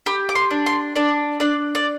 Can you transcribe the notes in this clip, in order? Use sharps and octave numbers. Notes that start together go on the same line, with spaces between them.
G4 B5
D6
C6
D4
C6
D4 D5
D4 D5
D5